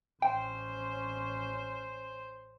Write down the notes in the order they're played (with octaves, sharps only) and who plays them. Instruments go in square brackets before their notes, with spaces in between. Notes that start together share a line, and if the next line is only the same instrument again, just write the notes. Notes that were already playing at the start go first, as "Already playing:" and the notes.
[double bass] A1 C#4 [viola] C5 [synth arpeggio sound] G5